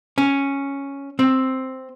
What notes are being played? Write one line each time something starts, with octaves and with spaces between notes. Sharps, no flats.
C#4
C4